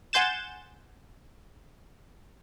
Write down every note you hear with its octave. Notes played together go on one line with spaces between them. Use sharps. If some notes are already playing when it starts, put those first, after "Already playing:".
F#5 G#5 C6 G6 A6 E7